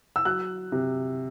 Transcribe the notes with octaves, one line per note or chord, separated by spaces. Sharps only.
E6
F#3 F#6
C3